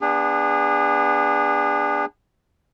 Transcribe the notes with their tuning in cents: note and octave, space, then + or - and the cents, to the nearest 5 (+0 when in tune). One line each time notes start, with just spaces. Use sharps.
B3 +0 D4 +5 G#4 -30